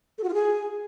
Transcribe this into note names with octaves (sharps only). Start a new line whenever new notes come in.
A4
F#4
F4
G#4